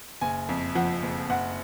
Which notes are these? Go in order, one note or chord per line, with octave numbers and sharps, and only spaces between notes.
F#1 G#5
F2
F3 F#5
F#1
F#1 F#5